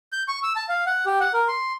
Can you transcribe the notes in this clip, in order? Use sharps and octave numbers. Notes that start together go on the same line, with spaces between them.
G6
C#6
E6
A5
F5
F#5
G4
F#5
A#4
C6